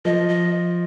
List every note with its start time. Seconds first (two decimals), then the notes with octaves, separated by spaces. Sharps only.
0.05 F3 D#5
0.29 D#5